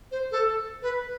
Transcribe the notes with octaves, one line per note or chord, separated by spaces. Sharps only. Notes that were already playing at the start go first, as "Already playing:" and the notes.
C5
A4
B4